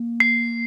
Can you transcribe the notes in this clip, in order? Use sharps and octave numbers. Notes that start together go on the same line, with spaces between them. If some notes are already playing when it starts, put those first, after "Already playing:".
Already playing: A#3
C7